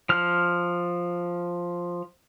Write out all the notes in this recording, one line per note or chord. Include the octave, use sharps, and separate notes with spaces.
F3 F6